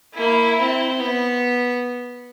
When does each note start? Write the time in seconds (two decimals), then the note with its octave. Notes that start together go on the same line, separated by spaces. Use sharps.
0.17 A#3 E4
0.60 C4
1.00 B3